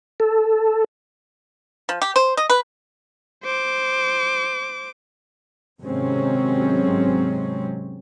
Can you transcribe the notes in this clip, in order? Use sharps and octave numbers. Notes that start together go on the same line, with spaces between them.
A4
F3
G4
C5
D#5
B4
C5 D6
G#1 C3 F#3 G#3 C4 C#4